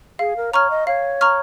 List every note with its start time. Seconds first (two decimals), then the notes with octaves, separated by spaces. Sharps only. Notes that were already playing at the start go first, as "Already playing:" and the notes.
0.19 G#4 F5
0.37 A#4
0.53 C#5 A#5 C#6 F6
0.70 D#5
0.87 C#5 F5
1.21 A#5 C#6 F6